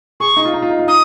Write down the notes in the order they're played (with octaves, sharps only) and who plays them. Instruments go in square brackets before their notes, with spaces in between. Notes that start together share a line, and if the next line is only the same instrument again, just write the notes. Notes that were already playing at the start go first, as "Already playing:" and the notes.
[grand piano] G#4 [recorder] C#6
[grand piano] D#4
F4
D#4
F4
D#4
F4
[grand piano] D#4 [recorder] D#6